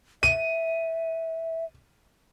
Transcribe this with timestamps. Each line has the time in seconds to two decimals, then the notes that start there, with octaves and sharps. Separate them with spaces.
0.23 E5 D#7